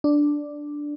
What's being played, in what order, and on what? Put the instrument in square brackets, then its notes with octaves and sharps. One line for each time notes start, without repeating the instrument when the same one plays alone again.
[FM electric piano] D4